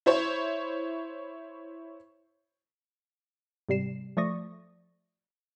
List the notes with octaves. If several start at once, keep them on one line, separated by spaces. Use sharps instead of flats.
E4 C5 C#5
G#2 C3 G3 C7 E7
F3 A3 D5 C#6 D#6 A#6